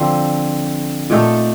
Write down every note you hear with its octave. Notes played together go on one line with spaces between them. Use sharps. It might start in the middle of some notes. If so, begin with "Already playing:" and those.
Already playing: D3 F3 C4
A#2 A3 D#4 A4